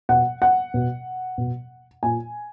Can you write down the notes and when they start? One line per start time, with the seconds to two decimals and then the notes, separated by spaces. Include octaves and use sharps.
0.09 B2 F#5
0.42 F#5
0.74 B2
1.38 B2
2.03 A#2 G#5